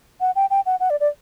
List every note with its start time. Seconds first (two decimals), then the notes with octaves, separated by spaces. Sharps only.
0.21 F#5
0.36 G5
0.50 G5
0.66 F#5
0.80 F#5
0.90 D5
1.00 D5